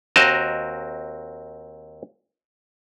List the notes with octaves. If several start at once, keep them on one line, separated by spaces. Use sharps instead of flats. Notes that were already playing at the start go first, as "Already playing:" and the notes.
D#2 C4 F#4 A#4 D#5 A5